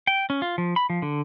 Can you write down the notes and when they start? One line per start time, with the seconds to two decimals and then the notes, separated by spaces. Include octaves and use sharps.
0.07 G5
0.30 C#4
0.42 F4
0.58 F3
0.76 B5
0.90 F3
1.02 D3